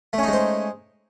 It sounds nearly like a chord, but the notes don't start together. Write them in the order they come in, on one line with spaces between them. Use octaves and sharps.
A3 C#4 D#4 G#3 C5